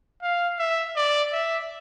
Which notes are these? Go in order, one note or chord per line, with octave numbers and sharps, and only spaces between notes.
F5
E5
D5
E5